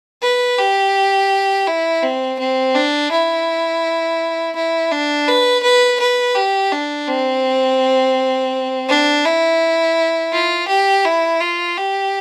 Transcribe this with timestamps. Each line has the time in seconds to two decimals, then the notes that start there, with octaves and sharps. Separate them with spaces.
0.22 B4
0.58 G4
1.67 E4
2.03 C4
2.39 C4
2.75 D4
3.12 E4
4.56 E4
4.91 D4
5.28 B4
5.63 B4
6.00 B4
6.35 G4
6.72 D4
7.08 C4
8.89 D4
9.25 E4
10.32 F4
10.68 G4
11.05 E4
11.41 F4
11.77 G4